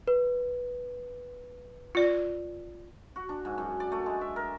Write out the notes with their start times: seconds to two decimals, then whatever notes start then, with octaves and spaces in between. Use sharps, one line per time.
0.08 B4
1.95 F4 D5
3.16 F#4
3.29 D4
3.45 G#2
3.58 F#2
3.80 D5
3.92 A3
4.06 G#3
4.21 E5
4.36 A#4